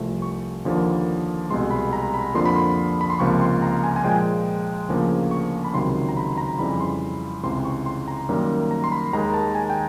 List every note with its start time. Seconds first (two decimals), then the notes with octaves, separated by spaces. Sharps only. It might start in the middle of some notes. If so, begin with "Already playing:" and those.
Already playing: C2 C3 F3 A3
0.22 C#6
0.65 D#2 D3 F3 A#3
1.50 C2 B2 G#3 C6
1.71 B5
1.93 A#5
2.14 B5
2.34 F2 D3 F3 A#3 C6
2.46 B5
2.56 C6
3.01 B5
3.10 C6
3.19 C#2 C3 F3 A#3 C#6
3.41 C6
3.62 A#5
3.84 G#5
3.96 G#5
4.04 A#2 F3 G#3 G5
4.89 D2 C#3 F3 A#3
5.31 C#6
5.64 B5
5.74 C#2 C3 D#3 F#3 C6
6.09 A#5
6.17 B5
6.38 A#5
6.59 F2 C#3 E3 G3 B5
6.81 C6
7.43 C#2 C3 E3 C6
7.65 C#6
7.86 C6
8.08 A#5
8.29 F#2 D#3 G3 A#3
8.71 A#5
8.84 C6
8.92 B5
9.13 D#2 D#3 G#3 A#5
9.34 A5
9.55 G#5
9.70 G5